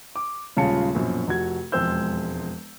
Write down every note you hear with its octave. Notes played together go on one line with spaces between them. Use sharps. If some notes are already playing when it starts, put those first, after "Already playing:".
D6
D#1 C#3 G#3 F4 A5 C#7
A#1 F#2 B2
F1 F#4 G#6
E1 F2 G#3 C5 E6 G6